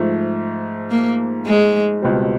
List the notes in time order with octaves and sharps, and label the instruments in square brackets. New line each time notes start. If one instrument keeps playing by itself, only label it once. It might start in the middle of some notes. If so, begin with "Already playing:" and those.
Already playing: [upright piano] G#2 F3 A3
[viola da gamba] A#3
G#3
[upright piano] C#2 B2 G3 C4